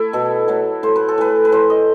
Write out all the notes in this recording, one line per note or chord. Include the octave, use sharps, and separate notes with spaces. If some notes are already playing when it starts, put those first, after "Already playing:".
Already playing: A3 E4
B2 A4
F#3 A3
A2 C5
B4
A4
E3 A3 B4
B4
A2 C5
D#5